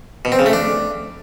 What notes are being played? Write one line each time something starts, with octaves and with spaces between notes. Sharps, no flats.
B2
C4
C#3
A3
D4